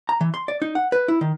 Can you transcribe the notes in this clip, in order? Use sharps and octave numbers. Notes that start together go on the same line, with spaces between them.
A#5
E3
C6
D5
D#4
F#5
B4
E4
D#3